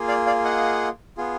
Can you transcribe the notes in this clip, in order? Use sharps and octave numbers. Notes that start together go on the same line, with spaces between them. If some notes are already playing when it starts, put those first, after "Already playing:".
Already playing: A#3 F4 G#4
D5 F5
D5 F5
D#5 F#5
B3 F4 G#4